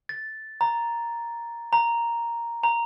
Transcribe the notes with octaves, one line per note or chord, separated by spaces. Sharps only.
A6
A#5
A#5
A#5